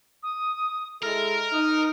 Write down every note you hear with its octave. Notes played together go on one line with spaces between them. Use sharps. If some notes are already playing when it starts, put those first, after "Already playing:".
D#6
G#3 E4 A4 A#4 F6
D#4 D#6